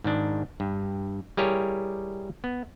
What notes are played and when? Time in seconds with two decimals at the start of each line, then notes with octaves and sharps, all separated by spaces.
0.04 G#2 D#3 D4
0.60 G2
1.37 G3 E4 G4 G#4 A#4 C#5
2.44 B3